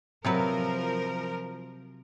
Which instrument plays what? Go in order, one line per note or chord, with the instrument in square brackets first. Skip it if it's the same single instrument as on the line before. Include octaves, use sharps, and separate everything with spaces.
[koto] C3 F#3 B4 [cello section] F3 A#4